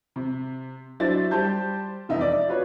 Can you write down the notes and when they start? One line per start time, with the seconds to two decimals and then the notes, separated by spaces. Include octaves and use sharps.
0.16 C3
1.00 F#3 D4 E4 C5 A6
1.31 G3 G4 C5 A5 G6
2.09 F1 E3 D#4 E5
2.21 D5
2.48 F4 F#4 B4 C#5